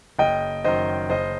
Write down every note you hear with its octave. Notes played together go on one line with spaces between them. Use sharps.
F#1 D#5 G5
F#2 D#3 C5 D#5
F#1 C5 D#5